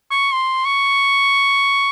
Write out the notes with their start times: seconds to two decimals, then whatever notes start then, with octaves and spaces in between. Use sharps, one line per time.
0.11 C#6
0.32 C6
0.65 C#6